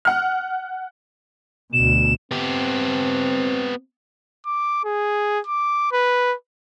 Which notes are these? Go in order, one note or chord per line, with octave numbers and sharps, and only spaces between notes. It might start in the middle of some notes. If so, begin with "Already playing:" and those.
F#5 F6
D2 B2 E7
B3 C4 G4
D6
G#4
D6
B4